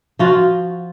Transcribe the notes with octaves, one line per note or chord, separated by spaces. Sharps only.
F3 F4 F#4